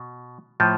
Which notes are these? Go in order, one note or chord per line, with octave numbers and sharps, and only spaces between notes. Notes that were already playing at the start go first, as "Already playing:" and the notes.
Already playing: B2
A2 F3